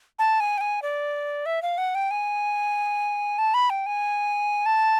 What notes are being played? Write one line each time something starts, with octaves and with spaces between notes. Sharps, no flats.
A5
G#5
G5
G#5
D5
E5
F5
F#5
G5
G#5
A5
B5
G5
G#5
A5